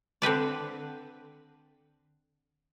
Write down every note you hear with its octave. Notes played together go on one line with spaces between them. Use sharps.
D3 C4 B4 D5